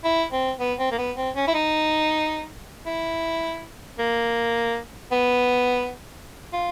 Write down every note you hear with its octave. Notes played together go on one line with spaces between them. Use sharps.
E4
C4
B3
C4
A#3
B3
C4
C#4
E4
D#4
E4
A#3
B3
F4